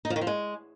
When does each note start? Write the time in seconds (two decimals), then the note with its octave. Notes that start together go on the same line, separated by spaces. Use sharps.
0.05 D#4
0.10 F3
0.16 D#3
0.21 F3
0.27 G#3